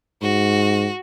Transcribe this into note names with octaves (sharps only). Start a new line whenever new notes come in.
G#2 F#4